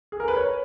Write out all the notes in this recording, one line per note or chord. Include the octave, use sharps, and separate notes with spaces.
G#4
A#4
B4
C#5